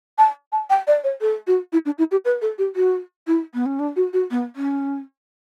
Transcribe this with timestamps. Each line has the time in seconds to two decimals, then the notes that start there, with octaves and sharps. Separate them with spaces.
0.18 A5
0.52 A5
0.70 G5
0.87 D5
1.04 C#5
1.21 A4
1.47 F#4
1.73 E4
1.86 D4
1.98 E4
2.11 G4
2.25 B4
2.42 A4
2.58 G4
2.76 F#4
3.27 E4
3.54 B3
3.66 C#4
3.79 D4
3.96 F#4
4.13 F#4
4.31 B3
4.56 C#4